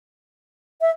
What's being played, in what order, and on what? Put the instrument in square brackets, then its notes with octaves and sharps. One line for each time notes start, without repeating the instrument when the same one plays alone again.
[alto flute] E5